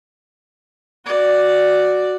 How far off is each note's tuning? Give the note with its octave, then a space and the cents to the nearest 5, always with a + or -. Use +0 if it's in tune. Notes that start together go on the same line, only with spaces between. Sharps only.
F#4 +0 D5 +0